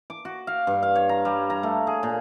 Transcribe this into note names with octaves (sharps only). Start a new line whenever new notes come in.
D6
F#4
F5
G2
F5
C#5
A#5
G3
A#5
A3
G#4
A#2